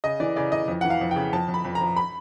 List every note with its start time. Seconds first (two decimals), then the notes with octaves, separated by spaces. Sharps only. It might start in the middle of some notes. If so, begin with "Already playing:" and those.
0.04 C#3 D#5
0.20 E3 D5
0.36 C#3 D5
0.52 E3 D#5
0.68 F2
0.81 F#5
0.85 E3
0.90 F5
1.01 F2
1.11 C#3 G5
1.33 F2 A5
1.48 F2
1.54 B5
1.65 F2
1.75 A#5
1.81 F3
1.96 B5